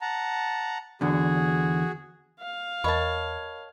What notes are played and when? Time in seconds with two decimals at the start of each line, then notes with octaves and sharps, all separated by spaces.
0.01 F#5 A5 A#5
1.01 E2 D3 F#4 G#4
2.40 F5
2.84 E2 A#4 C#5 D#5 A5 B5